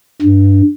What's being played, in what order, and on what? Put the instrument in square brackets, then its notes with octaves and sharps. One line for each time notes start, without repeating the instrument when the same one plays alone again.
[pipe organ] G2